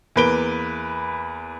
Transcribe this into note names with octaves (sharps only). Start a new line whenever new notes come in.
E2 A#3 B4 D7 G7